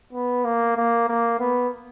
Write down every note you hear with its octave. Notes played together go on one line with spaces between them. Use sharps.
B3
A#3
A#3
A#3
B3